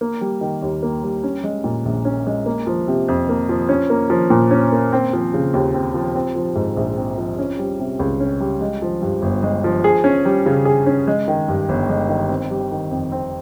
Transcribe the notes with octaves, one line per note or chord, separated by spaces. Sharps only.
A#3
G3
D#3
D#2
A#3
G3
C#4
G#3
A#2
A#1
C#4
G#3
A#3
F3
C3
F2
A#3
F3
C#4
A#3
F3
A#2
C#4
A#3
C4
F3
C#3
D#2
C4
F3
C4
F3
G#2
A#1
C4
F3
C#4
G3
C3
C#2
C#4
G3
G#3
F3
G2
G1
G#3
F3
G#4
C#4
G3
C#3
G#4
C#4
G#3
D#3
G2
G1
G#3
D#3
C4
G3
D#3
F2
C4